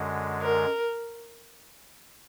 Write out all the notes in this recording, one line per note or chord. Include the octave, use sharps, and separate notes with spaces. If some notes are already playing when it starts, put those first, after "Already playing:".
Already playing: F#2 D3 G#3
A#4